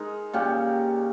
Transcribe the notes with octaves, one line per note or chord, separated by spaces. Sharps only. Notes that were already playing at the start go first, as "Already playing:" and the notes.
Already playing: G#3 D#4 A#4
A#2 G3 C#4 G4